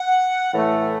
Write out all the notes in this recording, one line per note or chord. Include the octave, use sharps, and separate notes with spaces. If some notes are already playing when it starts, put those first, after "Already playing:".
Already playing: F#5
A2 E3 A3